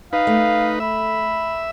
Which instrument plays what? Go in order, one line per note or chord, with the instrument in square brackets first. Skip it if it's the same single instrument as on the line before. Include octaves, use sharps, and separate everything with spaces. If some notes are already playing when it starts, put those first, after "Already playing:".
[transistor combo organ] D#4 B4 [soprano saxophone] F5
[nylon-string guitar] A3
[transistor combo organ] E5 [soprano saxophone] B5